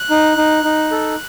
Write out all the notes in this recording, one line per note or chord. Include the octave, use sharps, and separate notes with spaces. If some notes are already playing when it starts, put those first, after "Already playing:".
Already playing: F#6
D#4
D#4
D#4
A4